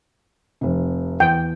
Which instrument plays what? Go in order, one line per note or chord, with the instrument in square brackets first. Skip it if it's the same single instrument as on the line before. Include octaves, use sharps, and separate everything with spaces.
[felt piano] F1 C3
[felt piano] E2 [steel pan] G5